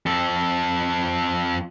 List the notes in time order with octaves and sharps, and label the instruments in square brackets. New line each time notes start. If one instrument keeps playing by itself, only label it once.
[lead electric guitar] F2 A4